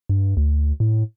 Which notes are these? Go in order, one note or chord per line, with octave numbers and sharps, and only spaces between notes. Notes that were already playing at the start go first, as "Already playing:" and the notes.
G2
D2
A2